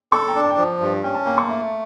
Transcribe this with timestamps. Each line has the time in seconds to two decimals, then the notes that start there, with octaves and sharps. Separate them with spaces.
0.12 A4 A5 C#6
0.28 G5 A#5
0.35 D4
0.43 A5
0.50 G5
0.58 F3 A5
0.80 G2
1.03 C#4 G5
1.14 A5
1.26 A#3 G5 A#5
1.37 A5 C#6
1.49 A3